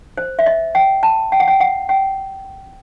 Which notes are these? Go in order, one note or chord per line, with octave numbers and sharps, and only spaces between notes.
C5
E5
D#5
G5
A5
G5
F#5
G5
F#5
G5